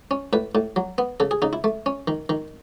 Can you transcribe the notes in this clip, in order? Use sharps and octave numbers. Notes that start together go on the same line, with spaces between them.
C#4
A2 B4
A2
F#3
B3
C#3 A4
G#4
C#3 D#4
E4
A3
C#4
D#3
D#3